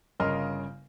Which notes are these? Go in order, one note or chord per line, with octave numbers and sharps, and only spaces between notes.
G1 C#3 A#4 D#5 C6 F6